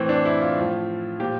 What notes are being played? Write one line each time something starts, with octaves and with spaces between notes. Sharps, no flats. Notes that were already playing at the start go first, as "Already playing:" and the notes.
Already playing: A2 E3 C4
D4
E4
F4
A2 F3
A#2 F3 G4